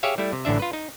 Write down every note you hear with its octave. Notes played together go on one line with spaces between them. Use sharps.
G4 G#4 C#5 E5 F5
G3 A3 E4
C3
A1 A2 D3 D4 E5
F4 B4
D#4